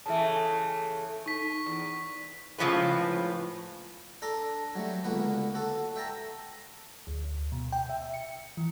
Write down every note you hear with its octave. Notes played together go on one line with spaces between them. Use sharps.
C#3 E3 A3 E5 A5
D#4 C#6 B6
E2
A2 C#3 F3 G#3 B4
D4 A4 A#5 C6 D6
F#3 G3 A3
C#2 D3 A#3 B3 F#4
F#4 A4
E5 G5 A5 A#5
D2
B2
G5
E5
C#7
E3